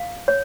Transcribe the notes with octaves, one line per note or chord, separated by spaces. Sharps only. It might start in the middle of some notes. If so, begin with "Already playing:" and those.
Already playing: F5
C#5